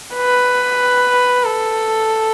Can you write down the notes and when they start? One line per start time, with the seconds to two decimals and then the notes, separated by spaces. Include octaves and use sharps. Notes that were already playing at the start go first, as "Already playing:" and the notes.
0.15 B4
1.44 A4